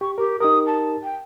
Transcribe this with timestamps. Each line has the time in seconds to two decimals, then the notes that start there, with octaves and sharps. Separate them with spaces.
0.01 G4 C#6
0.18 G4 A#4
0.40 D#4 G4 A#4 D#6
0.66 A5
1.03 G5